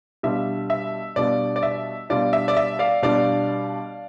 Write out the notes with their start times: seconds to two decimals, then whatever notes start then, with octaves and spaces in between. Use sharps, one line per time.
0.23 B2 G3 D4 F4 E5
0.70 E5
1.16 B2 G3 D4 F4 D5
1.56 D5
1.63 E5
2.10 B2 G3 D4 F4 D5
2.33 E5
2.48 D5
2.57 E5
2.79 D5 F5
3.02 B2 G3 D4 F4 D5 F5